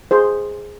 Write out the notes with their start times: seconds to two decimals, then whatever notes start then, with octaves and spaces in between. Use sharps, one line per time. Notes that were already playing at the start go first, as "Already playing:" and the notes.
0.11 G#4 C5